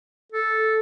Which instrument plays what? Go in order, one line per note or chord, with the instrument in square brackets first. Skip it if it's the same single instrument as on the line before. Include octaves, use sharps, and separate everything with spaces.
[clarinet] A4